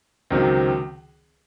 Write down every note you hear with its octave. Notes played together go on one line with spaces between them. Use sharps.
C#2 C3 D#3 F#3 C4